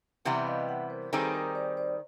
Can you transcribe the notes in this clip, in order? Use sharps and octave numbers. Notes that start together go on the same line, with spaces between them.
C3 E3 G3 B3 E5 F#5
D#5 F5
G5
E5 F#5
A#4 C5
D#3 G3 C4 D#4 G#4 A4 B4
A#4 C5
C5 D5
C5 D5